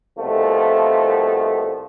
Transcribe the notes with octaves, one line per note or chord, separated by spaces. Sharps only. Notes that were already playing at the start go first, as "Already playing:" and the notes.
C2 B2 F3 A3